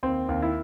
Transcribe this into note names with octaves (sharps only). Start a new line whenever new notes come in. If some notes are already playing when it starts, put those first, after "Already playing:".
D#2 C4
D#2
E4